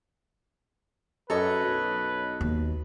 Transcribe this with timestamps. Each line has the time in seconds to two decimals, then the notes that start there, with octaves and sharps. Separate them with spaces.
1.30 F#2 A4 B4 C#5 D#5
1.67 B1
2.41 D#2